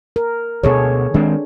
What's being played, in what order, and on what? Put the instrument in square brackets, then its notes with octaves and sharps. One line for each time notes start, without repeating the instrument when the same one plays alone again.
[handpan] A#4
[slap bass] D2 B2 [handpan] G#4 A4 C#5
[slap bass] D#3 G#3 C4 [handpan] D4